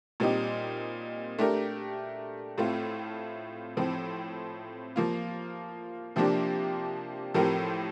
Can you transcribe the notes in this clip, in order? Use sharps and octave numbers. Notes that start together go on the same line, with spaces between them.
A#2 G3 C4 D#4
A3 D4 G4 A#4
A2 A3 C4 F4
A2 F3 C4
F3 A#3 F4
C3 F3 A#3 D4 G4
A2 F3 C4 G4 A#4